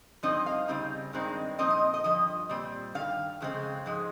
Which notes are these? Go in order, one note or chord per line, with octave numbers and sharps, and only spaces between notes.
G2 F3 C4 D#4 D#5
F5
C#3 G3 C4 D#4
G2 D#3 G#3 C4 D#4
A#2 F3 C4 D#4 D#5
D#5
D#5
G2 F3 D#5
A#2 G3 C4
G2 D#3 F5
F2 C#3 G#3 C4
G#2 F3 G#3